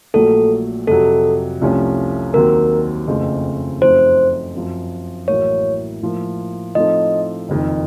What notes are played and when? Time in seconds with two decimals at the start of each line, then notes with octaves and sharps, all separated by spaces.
0.14 A#1 A#2 F#3 A3 A4
0.87 F2 C3 F#3 A4
1.61 C2 C3 F3 A3 C#4
2.34 D#2 D#3 F#3 C4 A#4
3.07 F#1 F2 C#3 A3 C4
3.81 F#2 F3 A3 C4 D#4 C5
4.55 F#2 F3 C4
5.28 A1 A2 F#3 A#3 C#5
6.02 A2 F3 A#3
6.75 A2 F3 C4 D#4 A4 D#5
7.49 F#1 F2 D#3